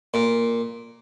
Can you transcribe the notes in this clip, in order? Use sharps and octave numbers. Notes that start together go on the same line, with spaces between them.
A#2